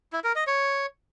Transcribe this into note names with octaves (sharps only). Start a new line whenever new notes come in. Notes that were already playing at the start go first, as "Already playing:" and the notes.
E4
A#4
D#5
C#5